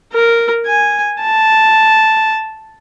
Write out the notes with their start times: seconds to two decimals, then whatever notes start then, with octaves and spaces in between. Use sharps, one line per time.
0.13 A#4
0.66 G#5
1.22 A5